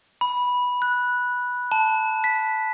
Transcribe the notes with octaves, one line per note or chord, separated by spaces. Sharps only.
B5
F#6
A5
B6